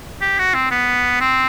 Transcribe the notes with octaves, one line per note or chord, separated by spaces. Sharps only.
G4
F#4
C4
B3
C4